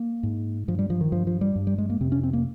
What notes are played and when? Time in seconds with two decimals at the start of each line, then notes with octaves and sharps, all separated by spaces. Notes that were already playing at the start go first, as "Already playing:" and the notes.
Already playing: A#3
0.23 G#2
0.68 G2 F3
0.79 G3
0.90 F3
1.01 D#3
1.12 G2 F3
1.27 F3
1.41 G3
1.56 G2
1.67 G3
1.78 G#3
1.90 A#3
2.01 F2 C3 C4
2.12 C#4
2.23 C4
2.33 A#3